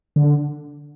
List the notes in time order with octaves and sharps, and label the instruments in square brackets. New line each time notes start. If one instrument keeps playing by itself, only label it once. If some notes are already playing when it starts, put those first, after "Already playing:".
[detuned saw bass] D3